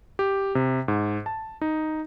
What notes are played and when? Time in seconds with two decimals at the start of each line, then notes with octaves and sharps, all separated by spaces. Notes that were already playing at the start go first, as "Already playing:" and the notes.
0.19 G4
0.55 C3
0.88 G#2
1.26 A5
1.61 D#4